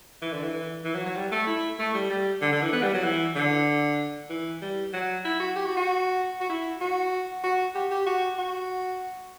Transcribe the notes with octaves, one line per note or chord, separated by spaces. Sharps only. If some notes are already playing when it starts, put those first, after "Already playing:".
E3
D3
E3
E3
E3
F#3
F#3
G3
A3
E4
A3
G3
G3
D3
D3
E3
B3
G3
F#3
E3
D3
E3
G3
F#3
E4
F#4
G4
F#4
F#4
F#4
E4
F#4
F#4
G4
G4
F#4
F#4